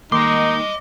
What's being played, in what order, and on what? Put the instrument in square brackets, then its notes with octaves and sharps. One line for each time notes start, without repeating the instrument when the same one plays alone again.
[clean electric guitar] D#2 D#3 A#3 [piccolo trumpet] D#4 [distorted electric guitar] D#5 C6 [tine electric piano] D6